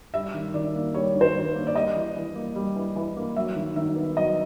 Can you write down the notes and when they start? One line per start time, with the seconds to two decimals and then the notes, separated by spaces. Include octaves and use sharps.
0.14 G3 E5
0.34 D#3
0.54 D#3 D5
0.75 A#3
0.94 G3 C#5
1.15 D#3
1.21 C5
1.35 D#3
1.55 A#3
1.67 D5
1.75 G3 D#5
1.96 E3
2.16 E3
2.35 A#3
2.56 G3
2.76 E3
2.96 E3
3.16 A#3
3.36 F#3 E5
3.56 D#3
3.76 D#3 E5
3.96 B3
4.17 F#3 D#5